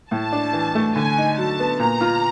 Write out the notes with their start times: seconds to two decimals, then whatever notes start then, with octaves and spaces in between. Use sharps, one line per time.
0.11 A2 A5
0.32 D4
0.53 E3
0.75 A3
0.95 D3 G#5
1.17 D#4
1.38 F#3 A5
1.59 B3
1.79 A#2 A#5
2.01 F4